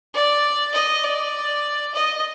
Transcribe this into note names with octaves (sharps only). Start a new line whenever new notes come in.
D5
D#5
D5
D#5